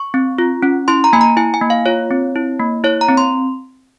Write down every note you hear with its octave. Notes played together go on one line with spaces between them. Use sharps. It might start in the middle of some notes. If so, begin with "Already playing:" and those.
Already playing: C#6
C4
F4
C#4
E4 C6
A#5
A#3 G#5
A#5
E4 G#5
G#5
A#3
F5
F4 C#5
C4
E4
A#3
E4 C#5
A#5
C4
C6